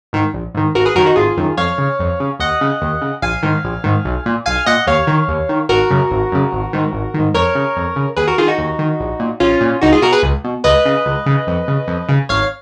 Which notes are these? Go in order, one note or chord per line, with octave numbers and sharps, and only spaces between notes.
G#2 D#3
A#1
G#2 D#3
G#1 F#4 A#4
G#4 B4
F#2 D#3 F#4 A#4
D#4 F#4
G#1 F4 G#4
F#2 D#3
F2 C#5 F5
C#3
F2
C#3
D#2 D#5 F#5
C#3
D#2
C#3
A#1 F5 G#5
G#2 D#3
A#1
G#2 D#3
B1
A#2
B1 F5 G#5
A#2 D#5 F#5
D#2 C#5 F5
D#3
D#2
D#3
G#1 F#4 A#4
F#2 C#3
G#1
F#2 C#3
G#1
G#2 D#3
G#1
G#2 D#3
F2 A#4 C#5
C#3
F2
C#3
D#2 G#4 B4
F#4 A#4
D#3 F4 G#4
D#4 F#4
D#2
D#3
A#1
A#2
A#1 C#4 F4
A#2
C#2 D#4 F#4
F4 G#4
B2 F#4 A#4
G#4 B4
C#2
B2
C#2 B4 D#5
C#3
C#2
C#3
F2
C#3
F2
C#3
G#1 C#5 F5